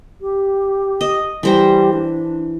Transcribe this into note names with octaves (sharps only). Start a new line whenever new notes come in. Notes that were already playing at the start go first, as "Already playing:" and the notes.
G4
D#5
E3 G3 C5 A#5
D4